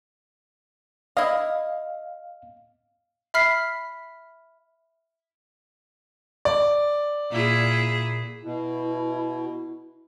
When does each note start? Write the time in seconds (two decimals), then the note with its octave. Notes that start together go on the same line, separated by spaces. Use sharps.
1.17 E4 D#5 F5
3.34 E5 B5 F6 B6 C7
6.45 D5
7.31 A#2 E4 G#4
8.43 B2 E4